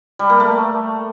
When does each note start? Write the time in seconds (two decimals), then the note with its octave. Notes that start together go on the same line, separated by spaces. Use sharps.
0.19 G3
0.30 A#3
0.40 A3